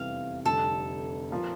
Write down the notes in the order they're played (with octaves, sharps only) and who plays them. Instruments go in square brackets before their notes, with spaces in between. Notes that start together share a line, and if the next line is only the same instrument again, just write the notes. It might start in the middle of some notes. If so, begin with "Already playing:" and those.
Already playing: [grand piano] F1 E2 C3 G3 C4 [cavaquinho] F5
[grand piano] F1 F2 D3 G3 [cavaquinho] A4
[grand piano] A#2 F3 A#3